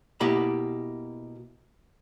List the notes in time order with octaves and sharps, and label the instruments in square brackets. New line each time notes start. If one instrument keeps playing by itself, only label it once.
[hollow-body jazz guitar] B2 A#3 E4 G4 B5